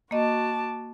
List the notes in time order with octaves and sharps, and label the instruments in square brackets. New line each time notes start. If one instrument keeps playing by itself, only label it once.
[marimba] A#3 D#5 [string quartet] F#4 A5 D6